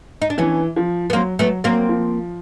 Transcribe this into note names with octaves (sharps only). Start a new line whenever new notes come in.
D#4
D4
E3 B3 C#4
F3
B3
F#3 A#3 C4
F#3 A3 B3
F#3 A#3 C4
F3